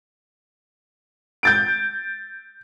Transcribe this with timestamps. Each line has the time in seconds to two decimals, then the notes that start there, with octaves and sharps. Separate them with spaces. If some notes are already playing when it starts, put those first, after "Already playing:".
1.43 G6 A6 D7